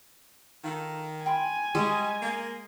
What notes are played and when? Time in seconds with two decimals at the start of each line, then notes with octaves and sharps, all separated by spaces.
0.64 D#3 F4 A4 A#5
1.26 G5 G#5 B5 C6
1.75 G3 G#3 D#5 C#6
2.22 A#3